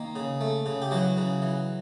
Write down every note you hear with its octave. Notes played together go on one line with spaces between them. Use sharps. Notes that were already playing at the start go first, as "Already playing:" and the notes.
Already playing: D#3 A#3
C#3
A3
C#3
G4
E3 F#3 F#4
C#3
E3